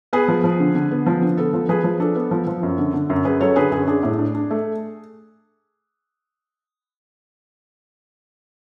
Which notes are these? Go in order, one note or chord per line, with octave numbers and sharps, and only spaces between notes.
B3 G#4 B4
F3
F3
D3
D3
B3
F3
D3
B3 A4
F3
F3 G#4 B4
F3
D4 A4
B3
F3
F3
F#2
D3
D3
F#2
F#2 G#4 B4
F#3 A4 C#5
D3 G#4 B4
F#2 G#4
D4 G#4
A2
D4
D4
A3